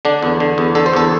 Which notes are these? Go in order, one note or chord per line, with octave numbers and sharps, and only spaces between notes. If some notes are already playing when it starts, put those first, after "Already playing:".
D3 D4
E2
D3
E2
D3 A4
C5
E2 A4